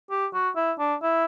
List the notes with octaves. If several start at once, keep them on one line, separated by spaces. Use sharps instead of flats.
G4
F#4
E4
D4
E4